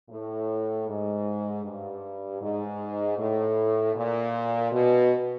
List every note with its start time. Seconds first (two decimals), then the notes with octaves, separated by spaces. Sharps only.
0.10 A2
0.88 G#2
1.64 G2
2.42 G#2
3.18 A2
3.95 A#2
4.71 B2